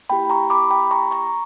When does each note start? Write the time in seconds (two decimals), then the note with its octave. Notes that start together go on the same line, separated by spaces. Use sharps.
0.10 A#3 E4 G4 G5 B5
0.30 A#5 C#6
0.50 B5 D6
0.71 G5 B5
0.91 A#5 C#6
1.11 A#5 C#6